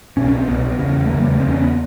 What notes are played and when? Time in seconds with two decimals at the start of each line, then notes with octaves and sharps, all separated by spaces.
0.17 C2 B2 C#4
0.28 C#4
0.38 C4
0.47 C2 B2 B3
0.79 E2 C#3
1.05 A3
1.10 E2 A#3
1.15 C#3
1.20 G3
1.30 A3
1.40 E2 C#3 C4
1.51 C#4
1.62 B3